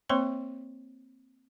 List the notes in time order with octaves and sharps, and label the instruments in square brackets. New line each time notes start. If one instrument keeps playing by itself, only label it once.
[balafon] A#3 C4 C5 C#5 C6 C#6